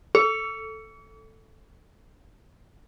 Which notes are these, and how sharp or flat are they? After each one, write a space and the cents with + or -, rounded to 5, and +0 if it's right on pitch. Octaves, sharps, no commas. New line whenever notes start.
A4 +0 C#6 +45